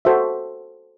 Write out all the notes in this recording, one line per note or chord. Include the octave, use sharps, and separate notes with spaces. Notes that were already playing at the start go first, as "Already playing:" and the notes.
F#4 A4 C5 E5